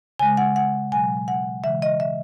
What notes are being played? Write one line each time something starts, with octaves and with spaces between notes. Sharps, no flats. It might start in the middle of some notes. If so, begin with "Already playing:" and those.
C#3 G#3 G#5
F#5
F#5
B2 F#3 G#5
F#5
C#3 E3 G#3 E5
D#5
E5